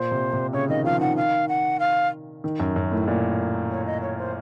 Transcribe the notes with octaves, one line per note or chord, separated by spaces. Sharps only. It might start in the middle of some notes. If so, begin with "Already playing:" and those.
Already playing: A#2 C5
C3
C3
C#3 C#5
D#3 D#5
F3 F5
D#3 F#5
F5
F#5
F5
D#3
F#2
F#2
A2
A#2
C#5
D#5
C#5
C5